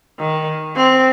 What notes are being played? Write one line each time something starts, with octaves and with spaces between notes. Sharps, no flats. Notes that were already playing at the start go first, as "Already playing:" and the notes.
D#3
C4